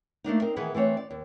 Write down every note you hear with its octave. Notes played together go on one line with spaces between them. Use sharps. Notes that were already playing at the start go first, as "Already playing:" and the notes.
A3 A#3 D4 D#4
C4 D#4 A#4
D#3 E3 B3 G#4 B4
E3 A3 C4 C#5
D5
D#2